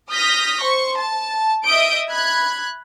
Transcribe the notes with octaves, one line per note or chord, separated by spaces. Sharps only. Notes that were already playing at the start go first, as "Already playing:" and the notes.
D#6 F6 G6 A#6 B6
C5 C#6
A5
D#5 E5 D#6 G6 D7
B5 F#6 G#6